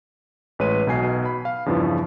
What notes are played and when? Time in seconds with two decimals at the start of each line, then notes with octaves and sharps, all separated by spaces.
0.59 A1 G#3 B4 C#5 C6 D#7
0.87 B1 B2 G#5 C7
1.25 B5
1.45 F5
1.66 E2 G2 C#3 E3 F3